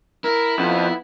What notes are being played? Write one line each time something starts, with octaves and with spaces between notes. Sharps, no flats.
E4 A#4
F2 B3